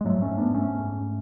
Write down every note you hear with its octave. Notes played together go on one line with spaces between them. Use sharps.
G#3
G#2 F#3 A3
A3 C#4
G#2
B3 D4
G#2 A3 C#4
G#2